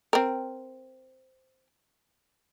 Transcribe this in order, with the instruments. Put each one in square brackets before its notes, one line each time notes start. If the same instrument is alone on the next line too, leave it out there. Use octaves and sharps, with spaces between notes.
[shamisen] C4 A#4